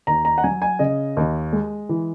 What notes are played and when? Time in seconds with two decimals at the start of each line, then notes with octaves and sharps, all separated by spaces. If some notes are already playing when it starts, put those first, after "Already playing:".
0.07 D#2 A#5
0.25 A#5
0.38 F#5
0.44 F#3 G#5
0.62 G#5
0.79 C#3 D#5
1.17 D#2
1.53 G#3
1.89 E3